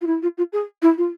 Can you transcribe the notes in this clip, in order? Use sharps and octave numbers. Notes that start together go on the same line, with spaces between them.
F4
E4
F4
F4
G#4
E4
F4